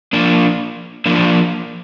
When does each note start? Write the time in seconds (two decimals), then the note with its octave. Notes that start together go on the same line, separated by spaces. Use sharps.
0.13 F3 A#3 D4
1.06 F3 A#3 D4